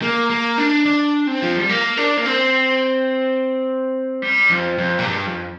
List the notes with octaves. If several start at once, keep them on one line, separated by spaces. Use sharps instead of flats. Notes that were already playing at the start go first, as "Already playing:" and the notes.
A#3
A#3
D4
D4
C4
F3
G3
A#3
D4
A#3
C4
G3
F2
F2
A#2
G2
F2